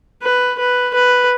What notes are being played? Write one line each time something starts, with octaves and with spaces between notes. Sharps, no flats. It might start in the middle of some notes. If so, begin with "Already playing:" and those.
B4
B4
B4